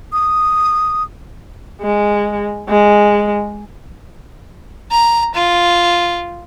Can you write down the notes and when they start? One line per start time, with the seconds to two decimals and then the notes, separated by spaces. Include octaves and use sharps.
0.12 D#6
1.82 G#3
2.69 G#3
4.91 A#5
5.35 F4